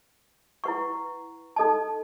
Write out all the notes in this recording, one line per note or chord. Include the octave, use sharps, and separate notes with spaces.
E4 B4 F#5 C#6
D#4 A4 D#5 A5